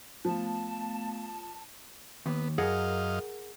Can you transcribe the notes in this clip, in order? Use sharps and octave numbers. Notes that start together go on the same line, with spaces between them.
F3 A3 B3 F5 A5
D#2 B3
F#2 G#4 A#4 D#5 F5 F#5